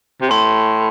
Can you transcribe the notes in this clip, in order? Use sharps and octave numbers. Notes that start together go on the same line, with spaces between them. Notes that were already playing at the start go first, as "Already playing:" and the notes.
C3
A2 C6